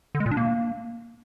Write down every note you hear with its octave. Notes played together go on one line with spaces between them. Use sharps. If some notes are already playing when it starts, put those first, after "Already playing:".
D3
G#3
A#2
D4
A#3